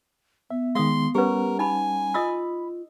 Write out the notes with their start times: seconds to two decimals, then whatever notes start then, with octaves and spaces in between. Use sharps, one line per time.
0.50 B3 E5
0.75 D#3 G#3 F5 C6 D#6
1.15 G3 C#4 G4 A#4 B4 F#5
1.59 D#4 G#5 A5 B5
2.14 F4 D#5 B5 D#6 E6